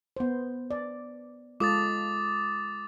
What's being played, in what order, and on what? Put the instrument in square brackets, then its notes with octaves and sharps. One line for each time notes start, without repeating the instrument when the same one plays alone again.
[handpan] B3 C5
D5
[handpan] G#3 F4 A4 [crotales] D6 D#6 A6